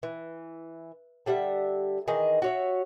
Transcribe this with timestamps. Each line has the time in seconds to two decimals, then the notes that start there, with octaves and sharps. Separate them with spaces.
0.03 E3
1.26 D3 G3 E5 F#5
2.08 D#3 E3 G#4 D#5
2.42 F#4 C#5 E5